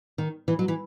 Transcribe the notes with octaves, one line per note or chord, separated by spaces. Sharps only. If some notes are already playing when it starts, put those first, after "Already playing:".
D#3
E3
F#3
E3